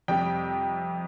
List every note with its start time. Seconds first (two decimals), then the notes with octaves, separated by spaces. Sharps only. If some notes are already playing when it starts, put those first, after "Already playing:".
0.08 F2 C3 G3 G5